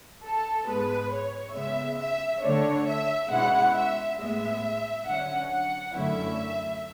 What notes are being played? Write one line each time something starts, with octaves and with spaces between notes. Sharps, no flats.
A4
G#2 G#3 B3 B4
C#5
C#3 G#3 B3 E5
E5
D3 A3 D4 C#5
E5
B2 G#3 C#4 E4 F#5
E5
A2 G#3 B3 E5
D3 F#3 C#4 F#5
F#5
F#2 D3 A3 C#4 E4 E5